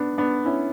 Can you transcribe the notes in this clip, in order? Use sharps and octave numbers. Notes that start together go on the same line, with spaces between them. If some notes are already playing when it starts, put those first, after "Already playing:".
Already playing: B3 D4
B3 D4
C#4 E4